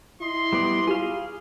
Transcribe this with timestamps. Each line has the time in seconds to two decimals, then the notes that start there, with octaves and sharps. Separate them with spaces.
0.21 E4 D#5 C6
0.53 G3 B3 D5
0.87 F4 G4 G#4 F5